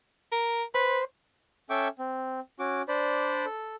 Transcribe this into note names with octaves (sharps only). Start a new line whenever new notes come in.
A#4
B4 C5
C#4 A4 E5 G5 C#6 D6
C4
C#4 F#4 D6
D4 C5 D5 B5
A4